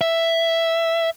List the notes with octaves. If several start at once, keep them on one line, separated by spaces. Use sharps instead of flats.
E5